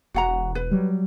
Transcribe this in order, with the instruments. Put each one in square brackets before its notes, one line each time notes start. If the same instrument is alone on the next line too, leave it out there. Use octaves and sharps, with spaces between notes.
[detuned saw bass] E1 [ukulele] F#4 F#5 A#5
[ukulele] B4
[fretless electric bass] F#3 G3